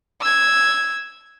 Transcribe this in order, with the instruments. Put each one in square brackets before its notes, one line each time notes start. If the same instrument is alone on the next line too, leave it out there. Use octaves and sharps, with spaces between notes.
[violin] E6 G#6